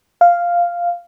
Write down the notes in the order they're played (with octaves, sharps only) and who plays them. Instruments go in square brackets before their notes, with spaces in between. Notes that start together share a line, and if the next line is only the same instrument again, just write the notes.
[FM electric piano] F5